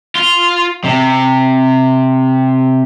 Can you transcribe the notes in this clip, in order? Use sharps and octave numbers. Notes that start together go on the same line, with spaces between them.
F4
C3